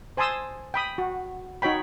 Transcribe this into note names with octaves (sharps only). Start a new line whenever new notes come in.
C5 G#5 A5 C6 D#6 E6
G5 B5 D#6
F#4
D#4 F#4 C#5 G5 B5